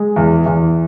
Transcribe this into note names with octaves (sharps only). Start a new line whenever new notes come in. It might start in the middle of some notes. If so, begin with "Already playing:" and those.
Already playing: G#3
E2
E2